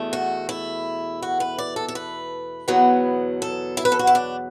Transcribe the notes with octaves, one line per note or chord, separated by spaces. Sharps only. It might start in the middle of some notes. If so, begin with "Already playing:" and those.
Already playing: E2 B2 A3
F#4
E4
F#4
B4
D5
A4
A4
B4
E2 B2 F#3 B3
A4
E4
B4
A4
F#4
E4
D4